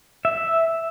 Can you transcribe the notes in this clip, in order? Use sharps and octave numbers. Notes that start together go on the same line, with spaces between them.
E5